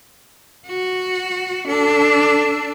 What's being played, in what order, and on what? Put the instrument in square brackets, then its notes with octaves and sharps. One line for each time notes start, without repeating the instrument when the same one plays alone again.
[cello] F#4
[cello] D4 [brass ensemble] A4